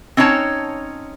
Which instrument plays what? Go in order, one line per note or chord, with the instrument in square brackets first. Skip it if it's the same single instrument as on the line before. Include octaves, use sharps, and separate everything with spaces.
[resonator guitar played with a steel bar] C4 C#4 D#4 C#5 A5